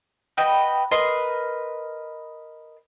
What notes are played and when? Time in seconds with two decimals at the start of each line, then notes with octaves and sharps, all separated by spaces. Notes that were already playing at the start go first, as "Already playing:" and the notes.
0.37 F#4 B4 D#5 G5
0.91 A#4 B4 D#5 C6